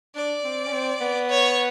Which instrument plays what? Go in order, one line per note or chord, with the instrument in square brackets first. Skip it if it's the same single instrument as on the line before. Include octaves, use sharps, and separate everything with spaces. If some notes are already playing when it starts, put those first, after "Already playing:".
[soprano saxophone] D4 [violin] D5
[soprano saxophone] C4
C#4
C4
B3
[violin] C#5